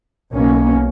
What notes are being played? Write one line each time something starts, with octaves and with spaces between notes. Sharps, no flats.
B1 B2 A#3 C#4